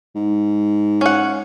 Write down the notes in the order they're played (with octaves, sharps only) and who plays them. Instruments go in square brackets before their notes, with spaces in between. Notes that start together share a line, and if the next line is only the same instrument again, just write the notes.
[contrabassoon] G#2
[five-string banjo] C#4 F#5